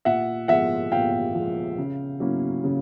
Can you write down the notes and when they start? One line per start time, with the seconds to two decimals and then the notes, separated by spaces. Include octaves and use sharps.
0.05 A#2 E5 F#5
0.48 F3 G#3 E5 F#5
0.92 A#2 F5 G5
1.35 F3 G#3
1.78 C#3
2.20 F#3 A#3 C#4 E4
2.64 C#3